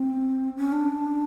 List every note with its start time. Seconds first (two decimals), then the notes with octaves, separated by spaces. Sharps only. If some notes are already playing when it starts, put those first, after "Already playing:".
Already playing: C4
0.57 C#4
0.72 D4